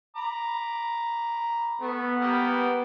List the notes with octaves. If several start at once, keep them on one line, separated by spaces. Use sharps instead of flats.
A#5 B5 D6
A3 B3
G3 A#3 G4